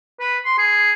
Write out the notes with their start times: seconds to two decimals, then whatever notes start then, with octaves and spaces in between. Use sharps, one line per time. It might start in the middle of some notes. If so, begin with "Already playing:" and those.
0.20 B4
0.45 C6
0.58 G#4